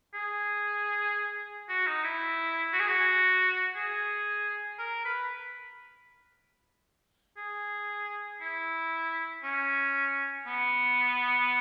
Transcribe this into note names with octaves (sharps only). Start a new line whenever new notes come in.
G#4
F#4
D#4
E4
F#4
G#4
F#4
G#4
A#4
B4
G#4
E4
C#4
B3